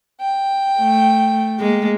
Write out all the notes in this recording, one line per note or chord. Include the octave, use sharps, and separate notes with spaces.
G5
A3
G#3 A#3